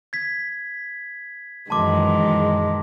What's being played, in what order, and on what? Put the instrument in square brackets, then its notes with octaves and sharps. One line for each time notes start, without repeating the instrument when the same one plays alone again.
[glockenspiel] G#6 B6
[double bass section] F#2 A#2 [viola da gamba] D#3 E3 G#3 [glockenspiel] A5 C6 D6